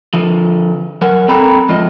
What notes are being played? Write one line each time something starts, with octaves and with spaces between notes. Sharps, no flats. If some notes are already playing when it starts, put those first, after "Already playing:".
D3 F3
F#3 A#4 F#5
C4 A4 G5 A#5 B5
G#2 F3 F4 D#5